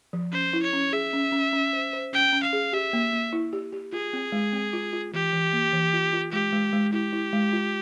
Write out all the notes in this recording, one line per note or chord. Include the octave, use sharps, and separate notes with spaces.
F3
C#4 C5
E4
C#5
C#4
G#4 E5
C#4
C#4
C#4
C5
C5
C#4 G5
C#4
F5
G#4
G4 E5
A#3
A#3
E4
G4
G4
F4 G#4
C4
G#3
C4
F4
F4
E3 G4
E3
A#3
E3
F4
F4
G#3 G4
G#3
G#3
E4 G4
E4
G#3
F4